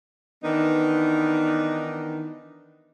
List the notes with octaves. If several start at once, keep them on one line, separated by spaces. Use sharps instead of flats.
D#3 E3 B3 D4 D#4